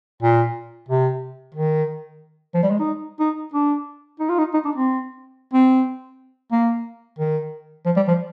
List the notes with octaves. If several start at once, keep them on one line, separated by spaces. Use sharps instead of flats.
A#2
C3
D#3
F3
G3
G#3
D#4
D#4
D4
D#4
F4
D#4
D#4
D4
C4
C4
A#3
D#3
F3
G3
F3